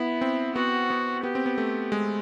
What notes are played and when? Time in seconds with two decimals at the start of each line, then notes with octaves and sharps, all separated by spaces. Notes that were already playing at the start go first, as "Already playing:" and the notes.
Already playing: B3 E4
0.21 C4
0.55 B3 F#4
0.90 B3
1.23 B3 G4
1.35 C4
1.46 B3
1.58 A3
1.92 G#3